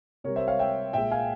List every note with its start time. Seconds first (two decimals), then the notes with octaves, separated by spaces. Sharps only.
0.24 C3 G3 A#4 C#5
0.36 C5 E5
0.47 C#5 F5
0.59 E5 G5
0.93 A#2 G#3 E5 G5
1.11 F5 G#5